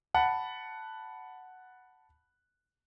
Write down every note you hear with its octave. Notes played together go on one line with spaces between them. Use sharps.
F#5 A5 B5